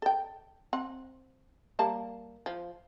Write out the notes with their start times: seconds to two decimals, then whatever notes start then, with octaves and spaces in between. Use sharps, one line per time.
0.02 A4 G5
0.73 C4 F#5
1.79 G3 A#3 A5
2.46 F3